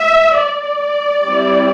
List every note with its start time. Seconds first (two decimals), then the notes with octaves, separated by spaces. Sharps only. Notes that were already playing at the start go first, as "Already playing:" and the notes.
Already playing: E5
0.42 D5
1.24 G3 C4 E4